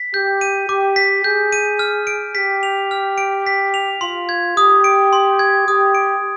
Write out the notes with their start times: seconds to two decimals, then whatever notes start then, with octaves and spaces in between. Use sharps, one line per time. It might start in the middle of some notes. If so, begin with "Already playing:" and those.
Already playing: B6
0.14 G4 G6
0.41 D#7
0.69 G4 D6
0.96 B6
1.24 G#4 G6
1.53 D#7
1.79 F6
2.07 D7
2.35 G4 B6
2.63 F7
2.91 F6
3.18 D7
3.47 B6
3.74 F7
4.01 F4 C6
4.29 G#6
4.57 G4 D#6
4.84 D7
5.13 C6
5.39 G#6
5.67 G4 D#6
5.95 D7